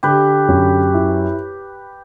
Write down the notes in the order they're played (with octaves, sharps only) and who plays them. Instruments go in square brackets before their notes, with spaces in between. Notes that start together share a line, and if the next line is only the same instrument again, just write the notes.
[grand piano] D3 [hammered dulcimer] G4 B4
[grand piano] F#2
E4